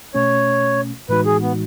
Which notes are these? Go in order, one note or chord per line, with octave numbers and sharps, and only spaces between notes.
B2 A3 C#4 C#5
A2 E3 G#3 D#4 F#4 B4
G#4
B3